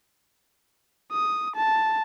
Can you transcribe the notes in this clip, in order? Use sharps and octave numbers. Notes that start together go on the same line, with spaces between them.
D#6
A5